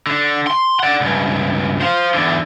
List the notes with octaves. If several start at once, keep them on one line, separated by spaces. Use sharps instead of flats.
D3
C6
D5 F#5
C#2 G2
C5 F5
E2 D3